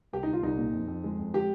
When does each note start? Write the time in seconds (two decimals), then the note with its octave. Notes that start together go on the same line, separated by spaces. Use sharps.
0.13 C2 G4
0.23 D#4
0.28 C2
0.33 F4
0.43 C2 D#4
0.58 A#2
0.73 F2
0.88 F2
1.04 G#3
1.18 F2
1.34 G#3 G4